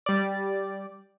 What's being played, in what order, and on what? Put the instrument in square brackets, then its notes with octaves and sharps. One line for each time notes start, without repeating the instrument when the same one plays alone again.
[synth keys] G3 D5